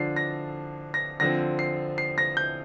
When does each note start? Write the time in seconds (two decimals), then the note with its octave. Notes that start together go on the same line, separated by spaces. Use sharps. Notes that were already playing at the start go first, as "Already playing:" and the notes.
Already playing: D3 F3 D4 C7
0.16 A#6
0.94 A#6
1.20 D3 F3 C4 A#6
1.59 C7
1.98 C7
2.18 A#6
2.37 G6